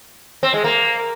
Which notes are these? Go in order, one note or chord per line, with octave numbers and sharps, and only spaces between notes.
C4
G#3
A#3